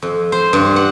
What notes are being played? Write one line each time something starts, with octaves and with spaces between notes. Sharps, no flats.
F2
C5
G2
F#5